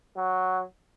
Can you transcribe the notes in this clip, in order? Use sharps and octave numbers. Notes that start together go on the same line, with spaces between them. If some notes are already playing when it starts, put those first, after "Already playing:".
F#3